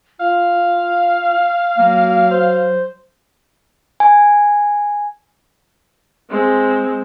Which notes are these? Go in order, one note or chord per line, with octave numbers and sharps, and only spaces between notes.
F4 F5
F#3 A#3
C5
G#5
G#3 C4